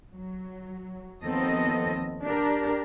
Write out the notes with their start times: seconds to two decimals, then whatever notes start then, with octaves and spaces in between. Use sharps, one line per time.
0.13 F#3
1.23 D#2 F3 B3 C4 A4 D#5
2.23 D4 G4 A#4